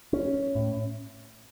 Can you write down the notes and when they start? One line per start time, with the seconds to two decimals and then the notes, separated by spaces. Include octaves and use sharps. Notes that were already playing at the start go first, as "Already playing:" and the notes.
0.13 C#4
0.55 A2